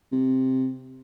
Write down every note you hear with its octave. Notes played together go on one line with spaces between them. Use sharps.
C3